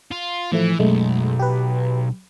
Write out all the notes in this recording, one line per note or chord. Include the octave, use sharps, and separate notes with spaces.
F4
A2 E3 F3 A3
B1 F#2 G#3 A3
G4 B4